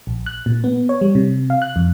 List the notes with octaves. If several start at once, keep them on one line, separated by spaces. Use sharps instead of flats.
A#1
F#6
A#2
B3
C#5
G3
C3
F5
F#6
F2